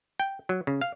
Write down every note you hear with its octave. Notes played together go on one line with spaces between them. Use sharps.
G5
F#3
C#3
F5